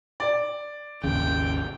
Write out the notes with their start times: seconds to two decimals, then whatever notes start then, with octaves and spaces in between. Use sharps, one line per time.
0.20 D5
1.04 G#1 D#2 C#3 G5